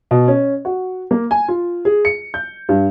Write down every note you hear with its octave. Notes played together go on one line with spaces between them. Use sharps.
B2
C#4
F#4
A#3
G#5
F4
G#4
C#7
G6
G2